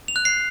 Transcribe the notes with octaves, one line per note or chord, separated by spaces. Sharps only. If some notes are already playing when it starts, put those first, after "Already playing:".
F7
F#6
C7